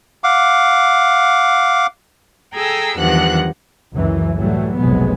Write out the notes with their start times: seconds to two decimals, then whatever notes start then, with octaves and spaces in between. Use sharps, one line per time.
0.24 F5 F#5 D6
2.54 G#4 A4 G5 G#5 A#5 E6
2.97 E2 G2 D#3 F3 F#5 F#6
3.94 C#2 F#2 E3
4.35 A2 E3 F#3 G3 A3
4.78 F1 B1 A2 F#3 G#3 B3